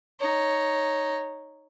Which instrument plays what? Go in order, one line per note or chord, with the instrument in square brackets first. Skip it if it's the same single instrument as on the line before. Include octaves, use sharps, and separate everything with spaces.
[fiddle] D#4 C#5